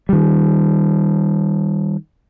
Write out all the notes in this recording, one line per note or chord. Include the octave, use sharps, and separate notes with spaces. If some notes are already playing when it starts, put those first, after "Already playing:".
D#3 G3